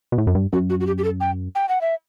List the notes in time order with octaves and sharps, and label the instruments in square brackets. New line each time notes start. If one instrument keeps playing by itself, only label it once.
[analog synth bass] B2
A2
F#2
G2
[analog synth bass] F#2 [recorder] F#4
[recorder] F#4
F#4
G4
G4
A4
G5
G5
F#5
E5